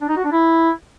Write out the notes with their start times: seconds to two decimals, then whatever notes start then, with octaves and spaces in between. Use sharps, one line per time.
0.01 D4
0.09 D#4
0.17 F#4
0.24 D4
0.32 E4